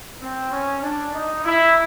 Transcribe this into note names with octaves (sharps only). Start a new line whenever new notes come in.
C4
C#4
D4
D#4
E4